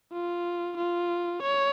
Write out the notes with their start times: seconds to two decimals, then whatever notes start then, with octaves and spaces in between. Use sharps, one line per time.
0.12 F4
0.78 F4
1.43 C#5